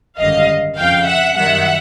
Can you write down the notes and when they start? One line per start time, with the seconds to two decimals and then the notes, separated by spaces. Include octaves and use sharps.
0.19 G#1 F#2 D3 G3 D#5 F5
0.77 F2 C#3 F3 F5 G5
1.07 E5 F#5
1.36 F#2 D#3 G3 E5 F#5